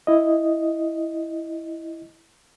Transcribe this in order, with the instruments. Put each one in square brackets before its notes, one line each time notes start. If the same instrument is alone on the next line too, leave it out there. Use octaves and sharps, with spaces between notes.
[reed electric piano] E4 D#5